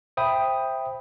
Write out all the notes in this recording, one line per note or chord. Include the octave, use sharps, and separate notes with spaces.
C5 E5 G5 B5 D#6